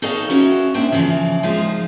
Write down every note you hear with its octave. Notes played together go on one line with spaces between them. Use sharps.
D#4 G#4 A4 C#5 D#5 F5
B3 C#4 E4 F#4
G#3 A#3 D4 C5 E5 G5
C#3 E3 F3
F3 G#3 D#4 F4